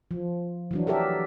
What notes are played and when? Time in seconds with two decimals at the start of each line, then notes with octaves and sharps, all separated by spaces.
0.11 F3
0.71 E3 F#3 D4
0.87 G4 A4 A#4 D5 E5